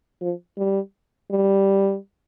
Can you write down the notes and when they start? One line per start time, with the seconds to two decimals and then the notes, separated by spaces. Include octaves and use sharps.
0.21 F3
0.57 G3
1.31 G3